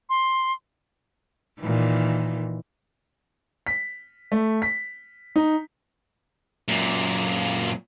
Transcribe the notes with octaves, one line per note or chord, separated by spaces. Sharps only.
C6
A#2 D#3 E3
B6
A3
B6
D#4
F#2 A#2